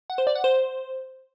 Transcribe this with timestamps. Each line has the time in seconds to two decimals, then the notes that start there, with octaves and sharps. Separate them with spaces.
0.10 F#5
0.18 C5
0.27 D5
0.35 F#5
0.44 C5